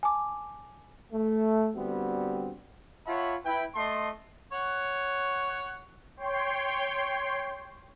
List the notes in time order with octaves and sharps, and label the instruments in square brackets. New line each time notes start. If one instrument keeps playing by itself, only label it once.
[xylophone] G#5 A5 D6
[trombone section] A3
D3 G3 B3 C4 F#4
[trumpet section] F4 C#5 E5 F#5 A5 B5
E4 B4 G5
A3 D#5 A5 C6
[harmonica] C#5 F#5
[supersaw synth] C#5 G5 C6